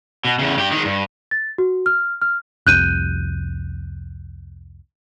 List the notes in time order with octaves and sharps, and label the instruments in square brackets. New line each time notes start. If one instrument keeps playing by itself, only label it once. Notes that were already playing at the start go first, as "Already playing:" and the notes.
[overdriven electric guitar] B2
E2 C#3
G2 G4
D#3 G#3
G2
[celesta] A6
F#4
F6
F6
[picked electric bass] C2 F2 C3 [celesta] F#6 G6 D#7